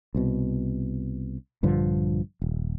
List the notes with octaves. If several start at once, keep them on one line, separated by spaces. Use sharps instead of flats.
C2 B2
A#1 G2 D3 F3
D#1